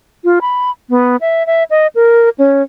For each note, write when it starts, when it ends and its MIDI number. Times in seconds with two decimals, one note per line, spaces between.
0.24 0.39 65
0.41 0.71 83
0.90 1.16 59
1.21 1.46 76
1.46 1.63 76
1.70 1.87 75
1.95 2.29 70
2.38 2.62 61